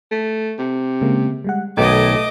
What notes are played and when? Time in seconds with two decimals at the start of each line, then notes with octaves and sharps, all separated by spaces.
0.11 A3
0.58 C3
1.01 C#3 G#3 A#3
1.44 G3 G#3 F#5
1.77 B1 D#3 A3 D#5 D6 G#6